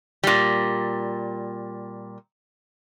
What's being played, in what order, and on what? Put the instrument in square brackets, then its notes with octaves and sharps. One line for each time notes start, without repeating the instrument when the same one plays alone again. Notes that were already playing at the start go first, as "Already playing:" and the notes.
[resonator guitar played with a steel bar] A#2 G3